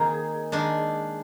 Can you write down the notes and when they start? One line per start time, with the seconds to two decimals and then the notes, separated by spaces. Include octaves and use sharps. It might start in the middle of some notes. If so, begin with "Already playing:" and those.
Already playing: D#3 A#3 C4 D#4 G#4
0.52 D#3 G#3 D4